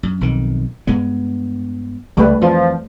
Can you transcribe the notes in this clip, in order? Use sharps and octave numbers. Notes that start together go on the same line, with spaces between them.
F#2
B1 F2 D#3
G2 G#3 B3
C#2 G3 A3 B4
F2 E3 F3